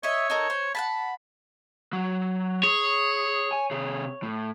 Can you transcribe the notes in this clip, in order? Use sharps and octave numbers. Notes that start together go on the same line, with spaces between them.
C#5 D#5 E5
D#4 A4 A#4
C5
F#5 G#5 A5 B5
F#3 F#4
G#4 C#5
G#5
C3 G#4
A2